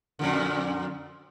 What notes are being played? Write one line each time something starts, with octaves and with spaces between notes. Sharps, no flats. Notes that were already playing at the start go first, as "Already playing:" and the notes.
F2 A#2 D3